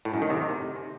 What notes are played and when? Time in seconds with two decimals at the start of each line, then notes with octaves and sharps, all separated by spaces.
0.05 A2
0.14 F#2
0.22 D#3
0.30 C3